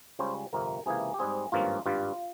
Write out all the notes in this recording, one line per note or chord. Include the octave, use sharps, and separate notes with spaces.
C#2 C#3 G3 C#4 C5
G1 F2 C3 A#4
C#2 C3 E3 A#3 G#4
G4
G#2 G3 C4 G#4
G#1 G2 F3 A#3 C#4 F4
G#1 G2 G3 F4